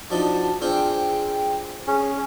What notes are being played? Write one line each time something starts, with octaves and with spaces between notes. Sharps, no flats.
F3 D4 D#4 F#4 A5
C4 D4 F4 G#4 G5
C#4 G#4